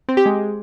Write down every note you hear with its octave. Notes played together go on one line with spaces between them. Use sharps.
C4
G4
G#3